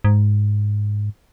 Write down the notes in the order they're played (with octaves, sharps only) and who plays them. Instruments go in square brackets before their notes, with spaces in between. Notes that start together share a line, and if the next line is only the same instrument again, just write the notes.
[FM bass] G#2